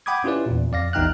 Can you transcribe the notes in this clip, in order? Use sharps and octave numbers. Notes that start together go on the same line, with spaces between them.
F#5 G5 B5 D6 D#6 G#6
C#4 E4 F4 G4 B4 D5
E2 A#2
F2 D5 F5 A#6
A1 E2 D#4 G5 F6 F#6